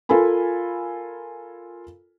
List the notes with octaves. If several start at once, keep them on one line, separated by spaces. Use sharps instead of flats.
F4 A4 A#4 G#5 B5